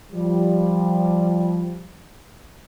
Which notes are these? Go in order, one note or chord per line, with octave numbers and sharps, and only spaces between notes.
F3 G3